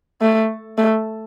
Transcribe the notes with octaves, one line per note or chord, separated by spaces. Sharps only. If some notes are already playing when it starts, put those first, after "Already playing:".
A3
A3